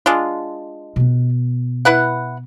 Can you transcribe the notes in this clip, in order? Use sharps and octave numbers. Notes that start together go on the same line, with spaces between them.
G#3 D4 F4
B2 B3
E4 B4 F#5